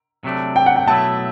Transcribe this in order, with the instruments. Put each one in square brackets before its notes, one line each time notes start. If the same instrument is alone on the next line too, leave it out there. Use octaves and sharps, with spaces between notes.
[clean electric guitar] C3 F#3 A3 D4
[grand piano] G5
F#5
G5
[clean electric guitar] B2 F#3 A3 E4 [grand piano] A5